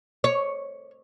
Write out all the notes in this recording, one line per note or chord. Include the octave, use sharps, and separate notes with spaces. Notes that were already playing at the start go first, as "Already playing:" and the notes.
C#5